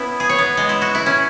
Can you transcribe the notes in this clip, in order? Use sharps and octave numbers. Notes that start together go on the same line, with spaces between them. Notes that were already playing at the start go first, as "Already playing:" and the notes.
Already playing: B3 C#4 E4
G#4
C#5
B3
G#3
E4
F#4
E4
C#4